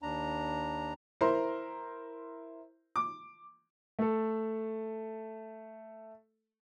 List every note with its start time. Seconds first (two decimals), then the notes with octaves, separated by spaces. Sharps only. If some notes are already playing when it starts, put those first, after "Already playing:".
0.02 D#2 D4 A#5
1.21 E4 A#4 C5 A#5 C6
2.96 D6
3.99 A3 A4